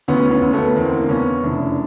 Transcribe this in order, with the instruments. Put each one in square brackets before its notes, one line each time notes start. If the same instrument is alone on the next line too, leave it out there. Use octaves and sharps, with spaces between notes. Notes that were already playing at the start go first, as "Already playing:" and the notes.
[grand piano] D2 B3 C#4
B3 C#4
D2
A3 B3
E2 A#3 C4
D4
C#3 B3 C#4
F1 D4 E4